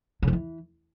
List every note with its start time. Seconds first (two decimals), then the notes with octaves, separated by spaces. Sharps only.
0.23 C#3
0.28 F2
0.33 E3